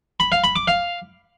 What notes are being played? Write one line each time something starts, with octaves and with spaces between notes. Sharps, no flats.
B5
F5
B5
D6
F5